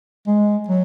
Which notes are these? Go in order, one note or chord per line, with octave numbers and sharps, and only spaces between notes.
G#3
F#3